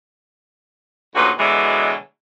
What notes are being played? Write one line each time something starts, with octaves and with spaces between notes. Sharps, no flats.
D2 A#2 C#3 D#4 F#4 B4
B2 D3 E3 F#3 G#3